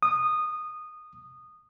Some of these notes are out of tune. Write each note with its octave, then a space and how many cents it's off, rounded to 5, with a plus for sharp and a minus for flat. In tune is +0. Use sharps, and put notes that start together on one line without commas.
D#6 -15